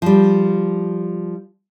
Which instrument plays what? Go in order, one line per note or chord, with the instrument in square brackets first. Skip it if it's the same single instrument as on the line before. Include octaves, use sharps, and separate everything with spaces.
[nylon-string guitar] F3 G3